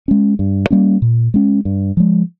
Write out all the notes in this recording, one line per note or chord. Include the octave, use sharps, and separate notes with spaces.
G#3 C#4
G2
G3 A#3 C#4
A#2
G#3 C#4
G2
F3 G#3